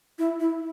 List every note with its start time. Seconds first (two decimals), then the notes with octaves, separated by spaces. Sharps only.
0.19 E4
0.40 E4